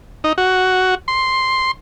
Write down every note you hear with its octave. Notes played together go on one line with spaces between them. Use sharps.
D#4
F#4
C6